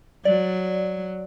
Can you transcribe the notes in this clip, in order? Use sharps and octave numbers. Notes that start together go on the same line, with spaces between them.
F#3 D5